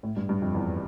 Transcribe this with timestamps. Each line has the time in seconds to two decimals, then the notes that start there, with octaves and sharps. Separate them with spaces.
0.03 A2
0.16 G2
0.29 G2
0.42 F2
0.54 E2